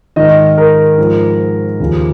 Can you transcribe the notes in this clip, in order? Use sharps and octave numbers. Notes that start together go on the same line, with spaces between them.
G#2 D#3 D#5
A#4
G#2 F3
D#2 C#3 F3